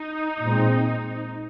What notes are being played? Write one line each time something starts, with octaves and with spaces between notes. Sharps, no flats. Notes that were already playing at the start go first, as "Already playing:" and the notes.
Already playing: D#4
A#2 G#3 C4